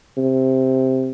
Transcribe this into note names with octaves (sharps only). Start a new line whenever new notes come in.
C3